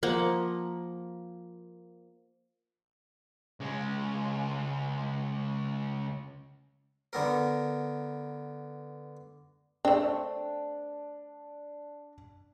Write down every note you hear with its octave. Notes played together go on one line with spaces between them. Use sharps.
F3 A#3 F#5
C#2 G#3
D3 B3 A#4
A3 C4 D4